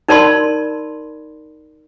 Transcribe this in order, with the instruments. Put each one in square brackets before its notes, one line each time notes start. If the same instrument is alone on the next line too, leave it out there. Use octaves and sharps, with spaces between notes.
[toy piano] D#4 A#4 D5 A5 B5 C6